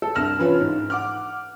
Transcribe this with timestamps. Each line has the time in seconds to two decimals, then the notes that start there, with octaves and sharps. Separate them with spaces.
0.02 A4
0.15 C2 G2 F6 A#6 E7
0.39 E3 C#4 F4 B4 C#5
0.61 G#2
0.90 F#5 D6 F6